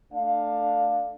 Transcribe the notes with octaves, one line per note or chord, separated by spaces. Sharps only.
A3 D4 F5